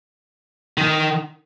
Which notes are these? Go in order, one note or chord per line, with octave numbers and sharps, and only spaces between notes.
D#3